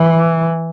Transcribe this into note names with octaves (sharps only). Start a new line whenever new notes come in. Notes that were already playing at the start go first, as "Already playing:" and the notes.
Already playing: E3